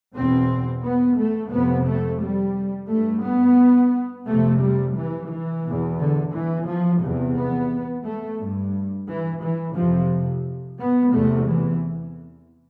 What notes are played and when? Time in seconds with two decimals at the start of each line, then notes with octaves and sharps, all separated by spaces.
0.15 E2 B2 C4
0.84 B3
1.18 A3
1.52 F2 C3 B3
1.86 A3
2.21 G3
2.89 G2 A3
3.23 B3
4.27 F2 C3 A3
4.61 G3
4.96 E3
5.30 E3
5.64 E2 B2
5.98 D3
6.33 E3
6.67 F3
7.01 E2 C3
7.36 B3
8.04 A3
8.39 G2
9.08 E3
9.42 E3
9.76 F2 C3 F3
10.79 B3
11.14 E2 C3 A3
11.48 E3